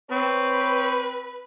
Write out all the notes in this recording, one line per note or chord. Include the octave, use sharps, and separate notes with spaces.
C4 B4 C#5